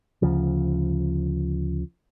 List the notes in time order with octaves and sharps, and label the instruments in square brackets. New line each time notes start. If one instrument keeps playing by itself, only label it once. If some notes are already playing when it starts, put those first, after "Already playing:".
[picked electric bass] D2 C#3 F3